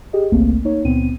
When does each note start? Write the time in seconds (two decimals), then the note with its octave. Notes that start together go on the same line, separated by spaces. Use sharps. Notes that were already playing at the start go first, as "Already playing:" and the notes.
0.13 G4 G#4 D#5
0.32 G#1 C#2 A3 A#3 C4
0.65 A#3 D#4 C#5
0.84 C#2 A#2 B3 C4 D#7